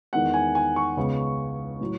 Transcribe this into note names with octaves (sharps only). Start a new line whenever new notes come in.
E2 D#3 G#3 F#5
G#5
G#5
C#6
C#2 C#3 G#3 B3
A2 F#3